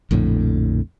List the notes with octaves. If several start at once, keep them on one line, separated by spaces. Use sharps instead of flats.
A#1 F2 A2 D3